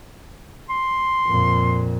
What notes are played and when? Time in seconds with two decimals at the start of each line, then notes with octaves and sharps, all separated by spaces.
0.70 C6
1.27 F2 A#2